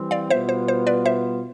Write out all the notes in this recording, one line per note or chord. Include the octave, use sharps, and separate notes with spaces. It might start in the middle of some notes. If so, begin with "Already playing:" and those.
Already playing: E3 G3 C4
D5 F5
B2 G3 B3 F4 C5 E5
C5
C5
B4 D5
C5 E5